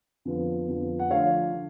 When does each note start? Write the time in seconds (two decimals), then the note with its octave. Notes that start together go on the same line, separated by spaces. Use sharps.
0.25 F2 D3 F3 B3
0.68 F2 D3 F3 B3
0.99 F#5
1.10 D3 F3 A3 D4 C#5 F5
1.53 D3